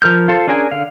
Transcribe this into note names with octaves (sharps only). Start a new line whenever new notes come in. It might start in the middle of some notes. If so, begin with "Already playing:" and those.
F3 A#4 F6 G6
F4 A4 C5
C#4 D4 G#4 A#4 G#5
D3 F5